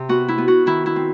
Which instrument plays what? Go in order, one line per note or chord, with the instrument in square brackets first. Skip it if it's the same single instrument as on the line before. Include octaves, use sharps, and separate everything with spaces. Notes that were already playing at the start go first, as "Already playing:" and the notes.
Already playing: [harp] C3
B3 F#4
E4
B3
F#4
D#3 E4
E4
C4